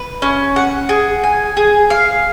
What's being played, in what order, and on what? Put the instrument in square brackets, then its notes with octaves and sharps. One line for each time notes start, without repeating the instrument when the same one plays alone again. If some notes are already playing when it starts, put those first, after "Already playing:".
Already playing: [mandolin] B4
C#4
F#5
G#4
G#5
G#4
F5